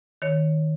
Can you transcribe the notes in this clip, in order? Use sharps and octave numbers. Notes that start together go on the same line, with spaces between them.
D#3 C#5